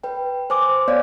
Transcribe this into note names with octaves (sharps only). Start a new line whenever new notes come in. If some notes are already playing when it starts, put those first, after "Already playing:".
B4 G5
C5 G#5 D6
B3 C#5 D5 F5